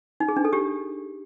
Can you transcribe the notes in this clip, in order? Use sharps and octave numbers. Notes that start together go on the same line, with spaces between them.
D#4
G#4
D4
A4
G4